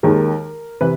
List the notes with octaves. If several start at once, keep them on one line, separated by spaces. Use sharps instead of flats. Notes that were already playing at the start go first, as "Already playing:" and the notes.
D#2 D#3 G#3 A#4
C3 E3 B4